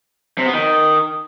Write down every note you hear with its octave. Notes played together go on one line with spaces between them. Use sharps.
C3
B3
D#3